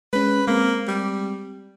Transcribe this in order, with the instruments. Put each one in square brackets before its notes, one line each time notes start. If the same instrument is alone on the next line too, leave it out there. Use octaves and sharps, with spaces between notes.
[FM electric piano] G#3 C#4 [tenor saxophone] B4
[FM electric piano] G#3 C4 [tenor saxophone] A#3
[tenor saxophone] G3